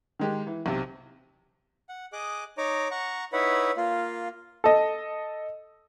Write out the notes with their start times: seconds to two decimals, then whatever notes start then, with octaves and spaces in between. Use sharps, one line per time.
0.19 D#3 G#3 G4
0.47 E3
0.66 B1 C3
1.89 F#5
2.13 G#4 D#5 D6 F#6
2.58 D#4 C#5 A#5 D6
2.91 F#5 A#5 C#6
3.33 D#4 E4 B4 C#5 F#5
3.77 A#3 F4
4.64 A4 D#5